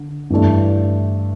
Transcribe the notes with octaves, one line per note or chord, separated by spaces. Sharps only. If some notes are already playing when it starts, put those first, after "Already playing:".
Already playing: D3
G2 E3 A3 D4